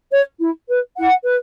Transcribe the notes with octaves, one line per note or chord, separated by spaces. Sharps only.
C#5
E4
B4
E4 F#5
B4